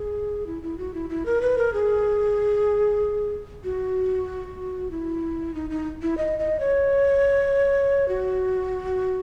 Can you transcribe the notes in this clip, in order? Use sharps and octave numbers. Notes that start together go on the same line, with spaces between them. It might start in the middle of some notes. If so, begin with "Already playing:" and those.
Already playing: G#4
E4
E4
F#4
E4
E4
A#4
B4
A#4
G#4
F#4
E4
D#4
D#4
E4
D#5
D#5
C#5
F#4